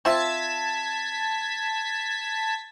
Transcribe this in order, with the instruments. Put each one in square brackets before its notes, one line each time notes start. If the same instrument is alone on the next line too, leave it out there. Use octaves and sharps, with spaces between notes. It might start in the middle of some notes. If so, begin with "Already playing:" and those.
[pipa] C4 F4 E5 [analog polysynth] A5 G#6 B6